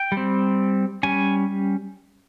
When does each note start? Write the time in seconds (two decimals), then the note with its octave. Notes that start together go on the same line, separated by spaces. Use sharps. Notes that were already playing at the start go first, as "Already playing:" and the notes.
Already playing: G5
0.12 G3
0.17 C4
1.03 G3 C#4 G#5